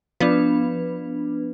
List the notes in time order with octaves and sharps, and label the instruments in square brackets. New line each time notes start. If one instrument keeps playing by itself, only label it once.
[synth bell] F3 B3 D4 B4